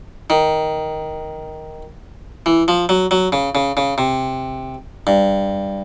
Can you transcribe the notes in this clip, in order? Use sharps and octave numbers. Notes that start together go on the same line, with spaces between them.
D#3
E3
F3
F#3
F#3
C#3
C#3
C#3
C3
G2